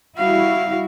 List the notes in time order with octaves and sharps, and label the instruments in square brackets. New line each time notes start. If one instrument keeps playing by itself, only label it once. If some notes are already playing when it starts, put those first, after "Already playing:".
[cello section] G3 E4 F#4 [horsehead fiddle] F5